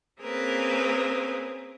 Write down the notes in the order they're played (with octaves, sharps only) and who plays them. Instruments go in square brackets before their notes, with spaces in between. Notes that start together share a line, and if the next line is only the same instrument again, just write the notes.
[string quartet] A#3 C4 C#4 G#4 A#4 B4